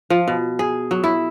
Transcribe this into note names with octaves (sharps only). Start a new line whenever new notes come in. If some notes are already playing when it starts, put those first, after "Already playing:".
F3
B2
G#4
F#3
E4